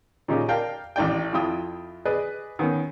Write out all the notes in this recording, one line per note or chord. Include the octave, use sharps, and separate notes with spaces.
A#2 C#3 C#4 D#4 G4
A#4 D5 F5 G5 A5
A1 D4 D5 G5
F2 E4 F4 G5 D#6
G#4 B4 D5 D#5
D#3 B3 C#4